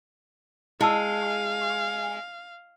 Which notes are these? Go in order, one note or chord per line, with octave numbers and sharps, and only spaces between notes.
G#3 E4 F5 A5 E6